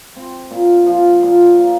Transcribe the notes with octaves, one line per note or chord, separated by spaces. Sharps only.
C4
A#2
F3
A#2
A#3